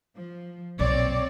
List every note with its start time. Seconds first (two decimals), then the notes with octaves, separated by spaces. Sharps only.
0.17 F3
0.79 B1 A#2 C4 C#5 D5